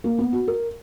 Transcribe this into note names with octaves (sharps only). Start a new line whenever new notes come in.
A#3
B3
F#4
A#4